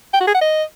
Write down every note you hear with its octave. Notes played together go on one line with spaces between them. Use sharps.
G5
F#4
G#4
F#5
D#5